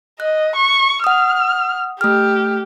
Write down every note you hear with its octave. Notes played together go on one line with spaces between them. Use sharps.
D#5 F#6
C#6
F#5 D#6 F6
A3 G4 F6